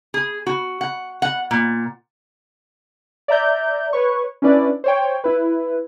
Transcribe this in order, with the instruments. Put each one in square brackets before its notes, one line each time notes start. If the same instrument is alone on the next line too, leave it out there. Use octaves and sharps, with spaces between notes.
[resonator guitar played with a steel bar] G#4
F#4
F#5
F#5
A#2
[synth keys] D5 E5 A#5 G6
B4 C#5 C#6
C#4 D4 E4 B4 D5
C5 C#5 G5
E4 B4